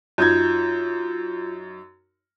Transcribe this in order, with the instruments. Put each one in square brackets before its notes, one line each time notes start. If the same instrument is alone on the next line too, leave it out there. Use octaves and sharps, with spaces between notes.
[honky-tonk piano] F#2 D#4 G#6 [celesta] F4 G6